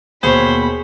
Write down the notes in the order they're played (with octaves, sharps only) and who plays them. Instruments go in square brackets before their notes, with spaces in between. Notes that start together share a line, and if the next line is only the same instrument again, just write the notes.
[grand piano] D#2 B2 [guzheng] G#4 C#5 [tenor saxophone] C5 [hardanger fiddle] B5